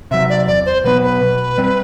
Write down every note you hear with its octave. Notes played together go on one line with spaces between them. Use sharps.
C3 F#3 E5
D5
E2 D5
C5
B2 F#3 B3 B4
B4
B2
G3 C4